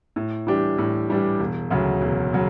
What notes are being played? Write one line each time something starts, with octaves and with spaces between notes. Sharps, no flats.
A2
E3 G3 D4 G4
A2
E3 G3 D4 G4
E1
D2 C#3 F#3
E1
C#3 F#3